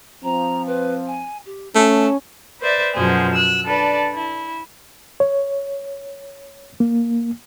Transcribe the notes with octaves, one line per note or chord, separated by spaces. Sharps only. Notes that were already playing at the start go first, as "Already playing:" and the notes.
F3 C4 A#5
B4
G#5
G4
A3 C#4 A5
B4 C5 D5 E5
F#2 B2 F3 G#4 C5
E6 F#6
D4 A4 B4 D5
E4
C#5
A#3